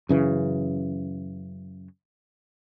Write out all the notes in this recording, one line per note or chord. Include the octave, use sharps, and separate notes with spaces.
F#2 C#3 E3